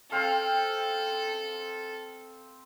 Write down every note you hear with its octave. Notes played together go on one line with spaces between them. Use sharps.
C4 A4 F5